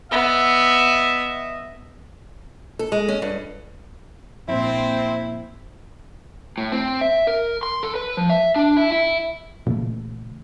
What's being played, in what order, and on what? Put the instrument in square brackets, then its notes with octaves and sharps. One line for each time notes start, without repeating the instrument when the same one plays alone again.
[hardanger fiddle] B3 [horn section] D#5 E5
[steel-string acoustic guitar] A4
G#3
C#4
G2
[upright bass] A#1 A#2 [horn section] C4 [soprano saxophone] E4
[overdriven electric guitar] A2
C4
E5
A#4
C6
A4
B4
F3
E5
D4
E4
E4
[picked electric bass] A#2 C#3 E3 A3